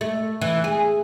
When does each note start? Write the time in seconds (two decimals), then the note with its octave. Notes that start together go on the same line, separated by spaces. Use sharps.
0.01 A3
0.42 E3
0.64 G#4